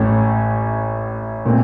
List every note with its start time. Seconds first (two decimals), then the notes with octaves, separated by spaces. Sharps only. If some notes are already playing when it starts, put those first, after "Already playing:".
Already playing: A1 A2 A3 C#4
1.45 A#2 A3 C4